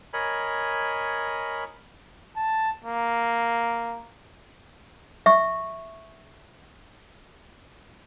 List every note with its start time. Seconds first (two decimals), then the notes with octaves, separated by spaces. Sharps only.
0.13 A#4 C#5 D#5 G#5 B5
2.36 A5
2.84 A#3
5.26 E5 C#6